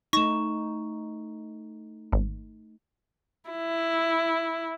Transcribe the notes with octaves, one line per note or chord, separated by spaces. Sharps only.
A3 D#4 C#6 A#6 E7
G#1
E4